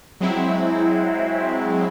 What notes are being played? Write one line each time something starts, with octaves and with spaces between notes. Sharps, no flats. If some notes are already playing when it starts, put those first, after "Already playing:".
F#3 G#3 C4 E4